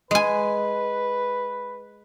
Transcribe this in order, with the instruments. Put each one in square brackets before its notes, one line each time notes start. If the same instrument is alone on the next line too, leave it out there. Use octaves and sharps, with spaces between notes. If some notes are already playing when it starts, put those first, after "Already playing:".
[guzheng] G#3 G#5 [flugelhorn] B4